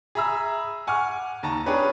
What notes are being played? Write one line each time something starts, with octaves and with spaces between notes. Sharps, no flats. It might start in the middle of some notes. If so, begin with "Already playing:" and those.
G#4 E5 A#5 B5 E6
F#5 G#5 C#6 D6 F6
D#2 A5 A#5
C#4 D4 G4 G#4 B4 C#5